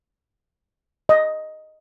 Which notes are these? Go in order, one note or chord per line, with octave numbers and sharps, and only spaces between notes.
D#5